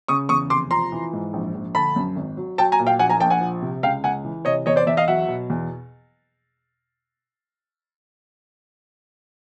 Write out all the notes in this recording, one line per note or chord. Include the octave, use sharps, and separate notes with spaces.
C#3 C#6 D#6
E2 C#6 D#6
F1 C6 D6
F3 A#5 C6
E3
G#2
A#1
A#1
D3 A5 B5
F#2
G#1
F#3
F#3 G5 A5
G#5 A#5
A#2
F5 G5
A#1 F#5 G#5
G#5 A#5
A#1 G5 A5
F#5 G#5
F3
C3
C#2 F5 G5
C#2 F#5 G#5
E3
C3 C#5 D#5
E2 C#5 D#5
C5 D5
E2 D5 E5
D#5 F5
F#3 E5 F#5
B2
E2